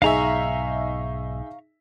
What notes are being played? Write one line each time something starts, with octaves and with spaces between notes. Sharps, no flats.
B1 G#2 D#4 G#4 E5 F5 A#5 C#6